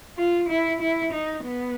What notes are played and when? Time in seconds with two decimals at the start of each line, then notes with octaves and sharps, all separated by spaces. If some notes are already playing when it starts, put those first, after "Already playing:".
0.18 F4
0.49 E4
0.81 E4
1.13 D#4
1.44 B3